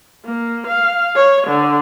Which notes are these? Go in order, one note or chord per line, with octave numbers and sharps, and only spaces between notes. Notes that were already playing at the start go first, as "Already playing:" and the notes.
A#3
F5
C#5
D3